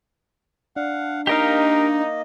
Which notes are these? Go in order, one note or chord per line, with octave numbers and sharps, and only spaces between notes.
D4 F5 F#5
A#3 D#4 G4 A#4 D#5 F5